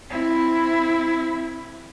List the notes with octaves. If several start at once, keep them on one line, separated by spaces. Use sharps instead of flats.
C4 E4